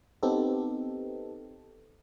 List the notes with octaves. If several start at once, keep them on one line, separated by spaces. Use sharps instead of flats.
B3 C4 D#4 G4 A4